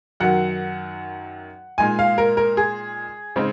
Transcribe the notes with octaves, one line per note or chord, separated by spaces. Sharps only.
F#2 D#3 F#3 F#5
A#2 G#3 D#4 G#5
F5
A#4
A#4
G#4
C#3 G#3 C4 D#4